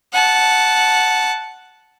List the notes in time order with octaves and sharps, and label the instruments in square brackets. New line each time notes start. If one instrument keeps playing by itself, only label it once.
[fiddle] F#5 A5